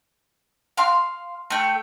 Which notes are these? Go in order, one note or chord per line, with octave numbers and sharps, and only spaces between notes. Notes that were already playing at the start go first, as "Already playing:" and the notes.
F5 C6
A3 G5